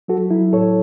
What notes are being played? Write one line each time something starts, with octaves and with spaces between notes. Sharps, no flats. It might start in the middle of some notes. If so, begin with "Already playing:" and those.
F#3 F#4 A4
F#3 E4
A2 A4 C#5